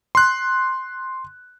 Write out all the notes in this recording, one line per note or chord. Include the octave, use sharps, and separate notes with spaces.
C6 F#6